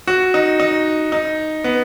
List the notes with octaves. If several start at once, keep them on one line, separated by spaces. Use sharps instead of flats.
F#4
D#4
D#4
D#4
B3